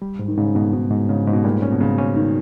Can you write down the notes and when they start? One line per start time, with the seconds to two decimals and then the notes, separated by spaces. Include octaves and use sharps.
0.02 G3
0.19 G#2
0.28 D#3
0.38 G#2 C#3
0.55 G#2 B2
0.73 G#2 B2
0.91 G#2
1.09 G#2 C#3
1.27 G#2
1.33 B2
1.44 A#2 G3
1.62 C#4
1.72 B2
1.80 G#2 C#3
1.98 C#4
2.16 D#3